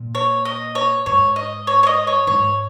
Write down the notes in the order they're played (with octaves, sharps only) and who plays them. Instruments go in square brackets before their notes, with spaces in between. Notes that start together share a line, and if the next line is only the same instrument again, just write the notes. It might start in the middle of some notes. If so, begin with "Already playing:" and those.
Already playing: [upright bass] A#2
[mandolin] C#5
D#5
C#5
[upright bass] G#2 [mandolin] C#5
[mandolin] D#5
C#5
C#5
D#5
C#5
[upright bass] G#2 [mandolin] C#5